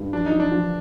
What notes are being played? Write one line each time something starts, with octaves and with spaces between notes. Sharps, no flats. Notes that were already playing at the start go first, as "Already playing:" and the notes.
Already playing: G2
F3 D4
D#4
F3
D4
F3